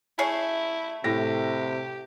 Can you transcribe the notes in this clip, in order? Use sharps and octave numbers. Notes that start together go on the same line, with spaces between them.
A3 E4 G#4 C#5
A2 C3 G4 A#6